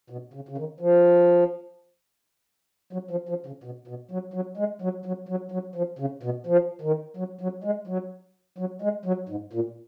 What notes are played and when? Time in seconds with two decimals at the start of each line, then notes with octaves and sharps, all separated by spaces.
0.10 B2
0.33 C#3
0.48 C#3
0.57 D#3
0.80 F3
2.93 F#3
3.11 F3
3.29 F3
3.46 C#3
3.64 B2
3.87 B2
4.11 F#3
4.34 F#3
4.57 G#3
4.82 F#3
5.06 F#3
5.29 F#3
5.51 F#3
5.75 F3
5.99 C#3
6.23 B2
6.46 F3
6.81 D#3
7.17 F#3
7.41 F#3
7.64 G#3
7.87 F#3
8.58 F#3
8.82 G#3
9.05 F#3
9.29 G#2
9.53 A#2